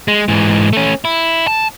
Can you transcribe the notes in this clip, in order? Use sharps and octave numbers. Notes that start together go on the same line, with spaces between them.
G#3
G#2 E3
A3 C#4
E4
A5